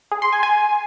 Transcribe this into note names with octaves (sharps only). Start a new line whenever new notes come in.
G#4
C6
G#5
G#5